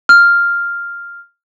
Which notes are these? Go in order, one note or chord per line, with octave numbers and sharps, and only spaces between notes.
F6